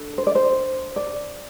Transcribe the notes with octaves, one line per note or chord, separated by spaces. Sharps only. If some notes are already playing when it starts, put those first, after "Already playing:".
Already playing: D4 A4
C5
D5
C5
D5